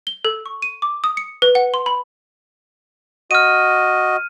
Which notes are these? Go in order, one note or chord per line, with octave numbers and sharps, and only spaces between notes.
G7
A4
C#6
D#7
D6
D#6
C#7
B4
F#5
C6
B5
F#4 D#5 F6 D#7